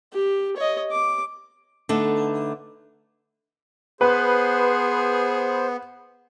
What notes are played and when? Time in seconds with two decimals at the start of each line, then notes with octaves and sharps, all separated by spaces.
0.13 G4
0.57 C#5 D#5
0.92 D6
1.89 D3 A3 B3 D#4 A4
4.01 B3 G#4 B4 C5